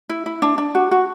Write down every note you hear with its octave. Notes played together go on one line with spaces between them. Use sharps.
E4
E4
D4
D4
F#4
F#4